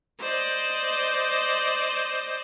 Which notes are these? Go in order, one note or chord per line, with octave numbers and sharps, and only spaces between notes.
C5 D5 D#5